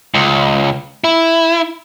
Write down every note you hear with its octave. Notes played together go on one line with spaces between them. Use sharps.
C#2
E4